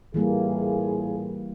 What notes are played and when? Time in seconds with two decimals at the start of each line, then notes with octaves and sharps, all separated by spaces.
0.14 A2 E3 G3 A#3 F4 G#4